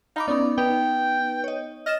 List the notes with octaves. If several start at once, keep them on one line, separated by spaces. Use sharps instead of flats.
D#4 F5 B5 D6
B3 C#4 D#4 D5
B3 D#4 B4 G5
C#5 D#5
D#5 F6 A6 E7